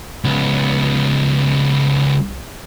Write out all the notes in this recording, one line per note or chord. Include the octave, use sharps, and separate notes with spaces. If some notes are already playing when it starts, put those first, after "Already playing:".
C#2 B3